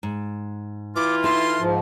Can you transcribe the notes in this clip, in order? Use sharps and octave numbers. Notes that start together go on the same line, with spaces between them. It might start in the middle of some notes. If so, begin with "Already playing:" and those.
G#2
E3 E4 F4 D6
D#4 A4 E5 C6
G#2 F3